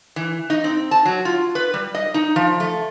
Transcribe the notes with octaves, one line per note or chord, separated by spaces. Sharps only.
E3
D#4
C4
A5
F#3
F4
B4
G3
D#5
D#4
F3
A3